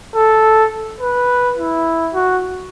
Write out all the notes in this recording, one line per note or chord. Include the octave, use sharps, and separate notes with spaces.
A4
B4
E4
F#4